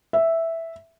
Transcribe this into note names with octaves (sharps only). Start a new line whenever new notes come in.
E5